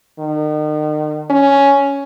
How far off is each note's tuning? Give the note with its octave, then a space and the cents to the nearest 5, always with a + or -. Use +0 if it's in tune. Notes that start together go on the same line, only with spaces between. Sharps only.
D#3 -40
C#4 +5